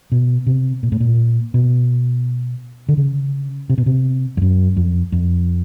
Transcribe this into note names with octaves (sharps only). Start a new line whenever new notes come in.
B2
C3
A#2
A2
A#2
B2
D3
C#3
C3
B2
C3
F2
F#2
F2
F2